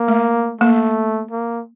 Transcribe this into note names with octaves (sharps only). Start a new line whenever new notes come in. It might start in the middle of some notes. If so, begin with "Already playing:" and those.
Already playing: A#3
A3
A3 A#3
A#3